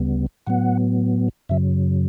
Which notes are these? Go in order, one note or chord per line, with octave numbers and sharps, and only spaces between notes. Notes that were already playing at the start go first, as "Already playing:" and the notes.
Already playing: D2 C#3 G3 B3
A2 F#3 B3 F#5
F#2 C#3 F#3 E5